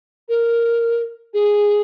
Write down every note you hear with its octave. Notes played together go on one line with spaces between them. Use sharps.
A#4
G#4